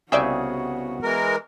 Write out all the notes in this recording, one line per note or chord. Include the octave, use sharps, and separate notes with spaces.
C2 C#3 B3 F#4 G#4 D5 E5 G5
E3 G#3 A#4